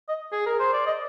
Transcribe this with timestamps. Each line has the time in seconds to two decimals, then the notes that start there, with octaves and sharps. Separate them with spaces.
0.09 D#5
0.32 G#4
0.46 A#4
0.60 C5
0.73 D5
0.87 D#5